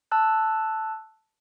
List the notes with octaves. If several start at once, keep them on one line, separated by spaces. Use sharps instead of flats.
A5 E6 F#6